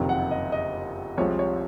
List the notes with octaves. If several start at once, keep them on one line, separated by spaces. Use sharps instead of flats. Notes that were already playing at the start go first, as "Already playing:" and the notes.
Already playing: F#1 F2 C3 D#3
F#5
D#5
D#5
C2 C3 F3 G#3 C#5
C#5